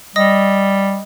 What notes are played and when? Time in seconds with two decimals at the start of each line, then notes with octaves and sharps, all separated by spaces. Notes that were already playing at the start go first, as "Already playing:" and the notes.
0.16 G3 D#5 D#6 A#6